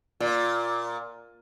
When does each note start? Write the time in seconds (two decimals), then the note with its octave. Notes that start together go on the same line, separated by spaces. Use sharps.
0.20 A#2